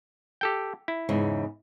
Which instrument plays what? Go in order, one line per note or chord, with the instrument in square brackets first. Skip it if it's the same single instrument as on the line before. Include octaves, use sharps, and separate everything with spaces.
[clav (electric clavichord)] G4 A4 G5
E4
[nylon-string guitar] E2 G#2 C#3